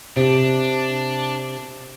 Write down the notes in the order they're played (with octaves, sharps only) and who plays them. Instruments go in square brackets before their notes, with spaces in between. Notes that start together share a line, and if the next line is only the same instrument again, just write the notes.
[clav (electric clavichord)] C3 [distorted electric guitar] D4